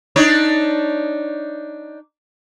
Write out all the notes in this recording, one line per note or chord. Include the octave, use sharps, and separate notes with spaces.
D4 D#4 C#5